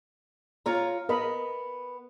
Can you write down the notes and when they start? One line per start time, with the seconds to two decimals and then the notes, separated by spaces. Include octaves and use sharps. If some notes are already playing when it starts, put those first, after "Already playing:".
0.66 F4 C#5 A#5
1.09 B3 A#4 D#5 B5